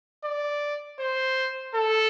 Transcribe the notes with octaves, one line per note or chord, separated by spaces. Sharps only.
D5
C5
A4